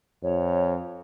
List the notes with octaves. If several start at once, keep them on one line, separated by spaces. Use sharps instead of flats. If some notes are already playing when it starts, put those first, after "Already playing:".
F2 C#5